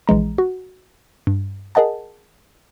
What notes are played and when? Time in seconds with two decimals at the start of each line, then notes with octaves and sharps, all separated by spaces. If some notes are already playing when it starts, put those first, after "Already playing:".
0.08 A#1 E3 G#3 A#5
0.38 F#4
1.27 G2
1.75 G#4 A#4 D#5 F#5 A5